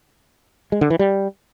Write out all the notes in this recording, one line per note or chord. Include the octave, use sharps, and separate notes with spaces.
G#3
D3
E3
G3